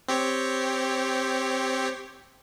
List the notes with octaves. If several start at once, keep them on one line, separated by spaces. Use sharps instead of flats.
C4 G4 C#5